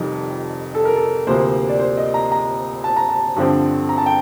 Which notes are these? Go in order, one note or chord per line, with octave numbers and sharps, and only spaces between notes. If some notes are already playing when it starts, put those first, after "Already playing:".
Already playing: F1 F2 D#3 G3
A4
A#4
A4
D2 C3 F3 A#3 C5
D5
C5
D#5
A#5
A#5
A5
A#5
A5
G2 D3 F3 C4
A#5
A5
G5